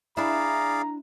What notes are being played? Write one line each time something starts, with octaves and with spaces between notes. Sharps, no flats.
D4 E4 G#4 D5 F5 A#5